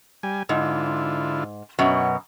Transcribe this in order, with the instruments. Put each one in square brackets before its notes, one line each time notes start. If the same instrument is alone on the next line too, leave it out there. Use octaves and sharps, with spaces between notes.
[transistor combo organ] G3 G#5
[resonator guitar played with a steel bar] G#2 [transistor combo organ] D3 E4 F4
[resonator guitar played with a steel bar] F#2 B2 [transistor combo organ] C#5